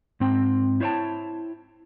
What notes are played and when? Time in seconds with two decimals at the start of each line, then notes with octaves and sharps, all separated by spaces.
0.20 G#2 C4 G5
0.80 E4 C5 C#5 F5 G5 A5